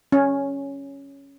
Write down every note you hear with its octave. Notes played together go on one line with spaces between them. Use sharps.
C#4